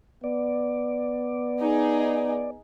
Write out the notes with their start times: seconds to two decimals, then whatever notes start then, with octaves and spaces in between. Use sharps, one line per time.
0.24 B3 D5
1.60 D#4 G#4